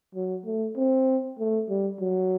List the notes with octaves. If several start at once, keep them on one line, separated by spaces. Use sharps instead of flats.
F#3
A3
C4
A3
G3
F#3